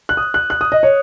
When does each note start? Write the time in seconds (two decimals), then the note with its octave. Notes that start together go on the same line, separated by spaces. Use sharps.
0.09 F#6
0.17 D#6
0.34 F#6
0.50 F#6
0.61 D#6
0.72 D#5
0.83 C#5